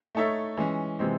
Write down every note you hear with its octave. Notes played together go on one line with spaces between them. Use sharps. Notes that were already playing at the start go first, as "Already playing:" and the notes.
A3 D#4 A4 C#5 E5
E3 G#3 C#4
C3 E3 G#3 C4